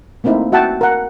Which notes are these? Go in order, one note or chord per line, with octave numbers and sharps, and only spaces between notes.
A3 A#3 C4 D#4 E4
F#4 E5 F#5 G5 A5
A#4 F#5